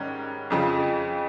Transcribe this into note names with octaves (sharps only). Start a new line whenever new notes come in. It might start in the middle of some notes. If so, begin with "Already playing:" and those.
Already playing: G#2 D#3 G3 C#4
F2 C#3 F3